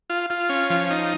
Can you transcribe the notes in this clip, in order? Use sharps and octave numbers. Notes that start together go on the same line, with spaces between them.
F4
F4
C#4
F3
D#4